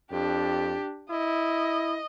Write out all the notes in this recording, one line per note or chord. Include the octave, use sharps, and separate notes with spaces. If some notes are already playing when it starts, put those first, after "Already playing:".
F2 D4 G4
E4 D#5